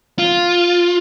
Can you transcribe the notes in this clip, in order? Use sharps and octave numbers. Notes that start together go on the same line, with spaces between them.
F4